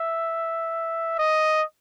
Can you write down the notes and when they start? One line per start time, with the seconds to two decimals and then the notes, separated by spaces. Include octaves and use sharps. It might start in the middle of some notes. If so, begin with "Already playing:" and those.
Already playing: E5
1.19 D#5